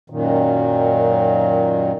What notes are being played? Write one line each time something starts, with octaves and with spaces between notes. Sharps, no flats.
F#2 A#2 D#3